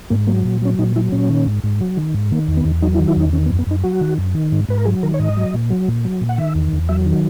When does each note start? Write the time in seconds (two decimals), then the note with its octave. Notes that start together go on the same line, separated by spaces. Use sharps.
0.10 G#2 A#3
0.27 F#3 A#3
0.45 A#2
0.62 F#3 C#4
0.79 A#2 D#4
0.96 F#3 E4
1.12 A#2 C#4
1.29 D#3
1.47 G#2
1.64 G#2
1.81 F#3
1.97 D#3
2.14 G#2
2.31 D#3 A#3
2.48 E2
2.57 B3
2.65 E2
2.82 F#3 D#4
2.95 E4
2.99 D#3
3.08 E4
3.16 E2 D#4
3.33 D#3 C#4
3.46 B3
3.50 F#2
3.59 B3
3.67 F#2 D#4
3.83 F#3 F#4
4.01 D#3
4.18 F#2
4.35 D#3
4.52 G#2
4.69 G#2 B4
4.78 A#4
4.85 F#3 G#4
5.03 D#3 A#4
5.14 C#5
5.19 G#2 D#5
5.37 F#3
5.54 A#2
5.70 F#3
5.88 A#2
6.05 F#3
6.21 A#2
6.29 F#5
6.38 D#3 E5
6.55 E2
6.73 E2
6.89 F#3 E5
7.06 D#3